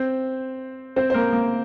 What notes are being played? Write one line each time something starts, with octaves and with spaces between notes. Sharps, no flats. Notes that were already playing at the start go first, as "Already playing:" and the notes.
Already playing: C4 C5
C4 C5
C5
A#3 A#4
A#3